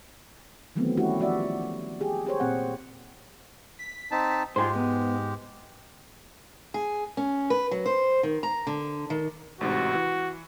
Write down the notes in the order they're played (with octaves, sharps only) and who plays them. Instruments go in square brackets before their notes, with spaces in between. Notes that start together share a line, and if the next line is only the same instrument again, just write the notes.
[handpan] D#3 E3 F#3 A3 B3 C4
G3 A3 C#4 E4 F#4 G4
F3 F#4 D5 E5
G4 G#4
G4 G#4 C5 C#5
A#2 C4 F#5
[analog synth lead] B6
[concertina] C4 D#4 A5
[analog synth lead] G#2 [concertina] G#3 G4 [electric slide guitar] F4 G#4 C5
[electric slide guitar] B3
[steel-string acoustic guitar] G#4
C#4
B4
F#3
C5
D#3
A#5
D3
D#3
[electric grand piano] A1 G#2 C3 [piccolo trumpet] F#4
[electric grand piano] E3